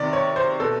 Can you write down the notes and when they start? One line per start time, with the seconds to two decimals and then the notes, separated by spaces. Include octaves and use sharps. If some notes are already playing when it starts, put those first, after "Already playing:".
Already playing: C3 D#3 D5
0.13 C#5
0.36 C5
0.59 B2 A4